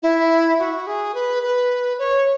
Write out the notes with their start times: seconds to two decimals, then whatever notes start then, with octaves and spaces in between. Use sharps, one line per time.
0.03 E4
0.59 F#4
0.87 G#4
1.15 B4
1.43 B4
1.99 C#5